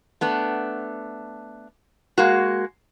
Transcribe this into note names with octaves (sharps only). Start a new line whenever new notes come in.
A3 B3 D4
G#3 A#3 F#4